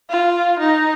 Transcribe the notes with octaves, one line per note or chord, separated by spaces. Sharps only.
F4
D#4